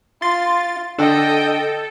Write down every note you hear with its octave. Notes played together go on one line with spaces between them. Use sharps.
F4 C6 A6
D3 D4 A4 D#5 G5